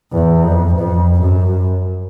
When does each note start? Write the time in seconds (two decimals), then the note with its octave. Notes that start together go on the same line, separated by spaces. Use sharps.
0.12 E2
0.44 F2
0.76 F2
1.22 F#2